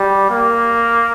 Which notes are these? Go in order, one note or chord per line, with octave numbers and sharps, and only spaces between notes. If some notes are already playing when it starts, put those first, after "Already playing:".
Already playing: G3
A#3